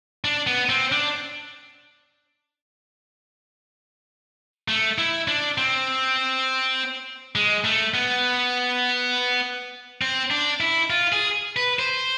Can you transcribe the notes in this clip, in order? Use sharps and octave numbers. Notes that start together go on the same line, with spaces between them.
D4
B3
C4
D4
A3
E4
D4
C4
G#3
A3
B3
C4
D4
E4
F4
G#4
B4
C5